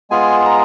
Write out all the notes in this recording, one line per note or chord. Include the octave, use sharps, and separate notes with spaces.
G#3 B3 F4 G#4 G#5
A#5